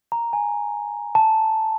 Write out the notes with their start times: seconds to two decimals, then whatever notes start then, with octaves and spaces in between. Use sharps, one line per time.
0.12 A#5
0.33 G#5
1.15 A5